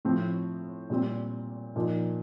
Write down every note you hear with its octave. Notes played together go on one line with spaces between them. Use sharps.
A2 F3 C4
A#2 G3 C4
A#2 F3 A#3 D#4